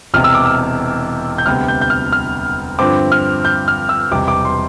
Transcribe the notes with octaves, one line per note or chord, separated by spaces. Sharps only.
E1 E2 C3 F6
E6
D6
E6
G6
D2 C3 G3 B3 F6
G6
G6
F6
F6
G2 D3 F3 C4 D6
F6
G6
F6
E6
E1 E2 C3 G3 D6
D6
C6